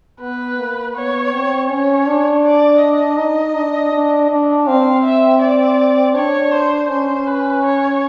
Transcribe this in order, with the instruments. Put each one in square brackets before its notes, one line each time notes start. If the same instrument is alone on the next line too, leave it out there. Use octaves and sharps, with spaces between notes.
[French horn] B3 [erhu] B4
[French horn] A#3
[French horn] B3 [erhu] C#5
[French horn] C4
[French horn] C#4 [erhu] C#5
[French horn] D4
[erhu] D5
D#5
[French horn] D#4
D4
D4
D4
[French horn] C4 [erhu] F5
[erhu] E5
D5
[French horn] D4 [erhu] C#5
[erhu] C5
[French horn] C#4 [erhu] C5
[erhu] B4
C#5